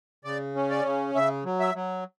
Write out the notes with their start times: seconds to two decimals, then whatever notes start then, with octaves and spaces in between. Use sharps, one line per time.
0.24 C#3 D5
0.55 C#4
0.70 D5
0.85 C#3
1.15 C#3 E5
1.45 F#3
1.60 E5
1.75 F#3